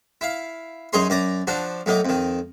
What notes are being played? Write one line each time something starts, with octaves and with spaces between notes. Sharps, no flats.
E4 F5
F#2 D#4 G#4 C#5 C6
F#2 D5 A#5
F3 D4 F#4
A2 F#3 A#3 D#4
F2 D#3